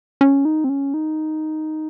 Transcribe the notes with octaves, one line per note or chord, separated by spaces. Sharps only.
C#4
D#4
C4
C#4
D#4